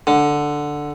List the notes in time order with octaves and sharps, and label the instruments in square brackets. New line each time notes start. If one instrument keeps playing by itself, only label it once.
[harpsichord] D3